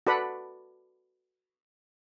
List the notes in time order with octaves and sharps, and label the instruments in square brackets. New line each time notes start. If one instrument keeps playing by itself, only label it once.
[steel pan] F#4 A4 B4 D5 F#5 B5